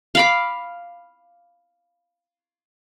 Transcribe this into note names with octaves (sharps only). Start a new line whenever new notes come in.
F5 B5 D6